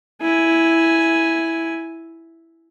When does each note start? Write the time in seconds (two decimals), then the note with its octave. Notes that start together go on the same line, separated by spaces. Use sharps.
0.21 E4 G#5